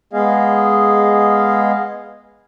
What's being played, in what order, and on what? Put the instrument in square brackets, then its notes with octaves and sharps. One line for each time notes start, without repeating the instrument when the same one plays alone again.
[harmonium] G#3 B3 G#4 D#5 F5